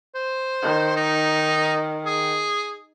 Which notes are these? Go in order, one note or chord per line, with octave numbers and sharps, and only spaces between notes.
C5
D#3
D#4
G#4